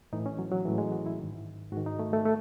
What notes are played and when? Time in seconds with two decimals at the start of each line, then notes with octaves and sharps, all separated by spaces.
0.13 A2 E3 D#4
0.26 C#4
0.39 F#3
0.52 F#3
0.65 E3 G#3
0.68 A2
0.78 G#3
0.92 F#4
1.06 E4
1.19 D#3
1.24 G#2
1.72 G#2 F#4
1.77 D#3
1.86 D#4
1.99 A3
2.13 A3
2.25 A3